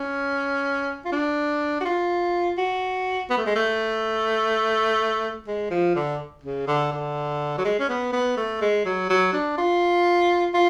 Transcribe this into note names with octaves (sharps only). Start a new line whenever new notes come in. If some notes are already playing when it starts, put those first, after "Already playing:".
Already playing: C#4
F4
D4
F#4
F4
F#4
B3
A3
G#3
A3
G#3
F3
D3
C#3
D3
D3
F#3
G#3
C#4
B3
B3
A3
G#3
F#3
F#3
D4
F4
F4